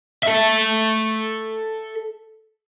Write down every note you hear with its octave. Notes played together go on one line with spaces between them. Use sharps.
A4 E5